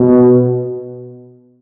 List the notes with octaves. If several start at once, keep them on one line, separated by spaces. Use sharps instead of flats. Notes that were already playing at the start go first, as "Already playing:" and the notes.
Already playing: B2